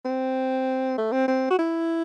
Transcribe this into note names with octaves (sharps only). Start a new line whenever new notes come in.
C4
A3
C4
C4
F#4
E4